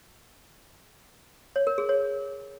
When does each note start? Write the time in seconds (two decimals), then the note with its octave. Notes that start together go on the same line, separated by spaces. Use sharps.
1.56 C#5
1.67 A#4
1.78 G#4
1.89 C#5